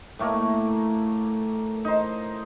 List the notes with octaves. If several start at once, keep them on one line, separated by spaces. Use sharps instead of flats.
A2 A3 A#3
D#4 C5